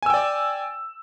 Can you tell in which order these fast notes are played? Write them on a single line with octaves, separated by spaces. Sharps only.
G#5 E6 G5 D5